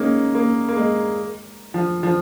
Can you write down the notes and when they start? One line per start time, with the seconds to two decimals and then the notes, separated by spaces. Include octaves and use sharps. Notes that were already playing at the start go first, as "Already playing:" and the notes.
Already playing: G#3 A#3 C#4 D#4
0.35 A#3
0.68 A#3
0.77 G#3
1.74 F3
2.03 F3